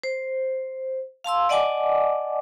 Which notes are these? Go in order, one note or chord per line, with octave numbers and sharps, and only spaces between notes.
C5
F5 A5 C6 E6
D5 D#5 F#5 G#5 A5 D6